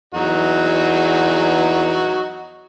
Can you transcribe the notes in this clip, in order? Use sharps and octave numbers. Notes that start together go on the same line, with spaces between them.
E2 F#3 D#4 F#4